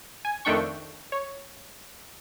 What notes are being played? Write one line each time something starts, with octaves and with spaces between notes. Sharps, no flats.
G#5
F2 D#3 A3 D4 G5 C#6
C#5